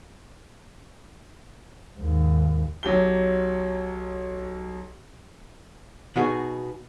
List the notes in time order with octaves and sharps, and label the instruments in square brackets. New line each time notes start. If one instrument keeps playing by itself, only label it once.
[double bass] D#2 G#2
[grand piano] B1 F#3 G4 G7
[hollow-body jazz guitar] B2 B3 D#4 F#4 G#4